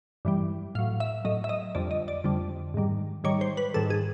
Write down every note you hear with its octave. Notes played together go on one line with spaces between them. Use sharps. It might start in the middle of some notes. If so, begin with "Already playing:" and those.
G2 E3 G3
A2 F#3 F5
E5
A2 F#3 D#5
E5
D#5
F2 D3 G3 D5
D#5
D5
F2 D3 G3
G#2 D#3 G3
G#2 D#3 G3 C#5
C5
B4
G#2 D#3 G3 A4
G#4